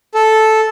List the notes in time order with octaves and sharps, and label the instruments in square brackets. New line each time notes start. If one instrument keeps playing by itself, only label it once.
[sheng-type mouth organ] A4